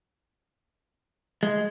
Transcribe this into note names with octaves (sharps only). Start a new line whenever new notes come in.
G#3